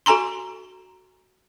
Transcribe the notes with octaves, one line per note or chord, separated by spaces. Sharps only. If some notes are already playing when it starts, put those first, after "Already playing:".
F#4 A4 G#5 A#5 C6